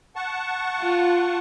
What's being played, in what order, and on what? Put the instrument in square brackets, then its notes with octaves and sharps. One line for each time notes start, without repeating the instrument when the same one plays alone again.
[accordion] F#5 A5 C#6
[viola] F4